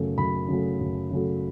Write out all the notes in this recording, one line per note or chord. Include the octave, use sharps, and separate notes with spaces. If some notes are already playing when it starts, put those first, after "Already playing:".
Already playing: F#2 C#3 F#3 A3
F#2 B5
C#3 F#3 A3
F#2
C#3 F#3 A3